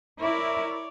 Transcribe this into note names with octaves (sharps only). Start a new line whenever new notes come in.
E4 A#4 C#5 D5